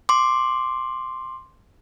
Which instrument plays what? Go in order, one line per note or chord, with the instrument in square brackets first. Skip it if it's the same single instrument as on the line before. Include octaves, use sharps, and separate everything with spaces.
[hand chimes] C6 D6